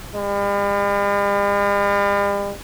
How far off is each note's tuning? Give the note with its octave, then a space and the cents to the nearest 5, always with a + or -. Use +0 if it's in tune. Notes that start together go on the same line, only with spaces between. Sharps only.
G3 +45